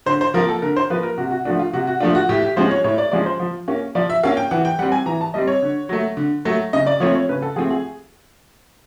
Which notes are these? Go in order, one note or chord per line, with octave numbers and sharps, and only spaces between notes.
D3 C5
C5
F3 A#3 A#4
A4
D3 A#4
C5
F3 A#3 B4
A#4
C3 F#4
F#4
F3 A3 D4 F#4
F4
C3 F#4
F#4
F3 A3 D4 F4
F#4
A2 G4
G4
F3 G#3 C#4 C5
C#5
A2 C#5
D5
F3 G#3 C#4 D5
C5
F3
A#3 C#4
F3 D5
E5
A#3 C#4 F5
G5
E3 F#5
G5
G3 C4 F#5
G#5
E3 A#5
A5
G3 C4 D#5
C#5
D3
F#3 A3
D3
F#3 A3
C#3 D#5
D5
F3 A3 C4 C#5
C#5
C#3 B4
A4
F3 A3 C4 G#4
G#4